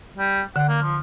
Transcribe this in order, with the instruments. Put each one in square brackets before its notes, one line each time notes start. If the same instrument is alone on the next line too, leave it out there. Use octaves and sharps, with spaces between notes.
[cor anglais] G3
[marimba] D3 [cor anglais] F#5
[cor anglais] A#3
F3